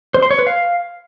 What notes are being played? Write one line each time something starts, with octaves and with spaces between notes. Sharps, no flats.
C5
C6
C#5
B4
F5